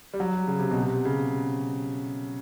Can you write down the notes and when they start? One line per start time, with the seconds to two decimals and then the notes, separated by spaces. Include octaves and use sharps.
0.14 G3
0.20 F#3
0.47 C#3
0.59 C3
0.71 B2
0.83 C3
1.05 C#3